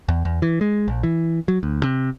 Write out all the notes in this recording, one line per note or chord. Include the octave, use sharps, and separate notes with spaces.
E2
E2
E3
G#3
A#1
E3
F#3
D2
C3